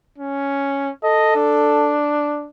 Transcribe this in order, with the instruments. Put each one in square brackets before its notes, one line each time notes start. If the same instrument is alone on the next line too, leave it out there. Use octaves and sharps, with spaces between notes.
[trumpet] C#4
[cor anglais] A4 [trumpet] D#5
[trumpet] D4